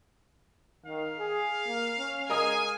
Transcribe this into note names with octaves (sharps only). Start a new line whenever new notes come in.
D#3 F5
G#4
A#3
C#4
G#3 A#4 D#5 G#5 D#6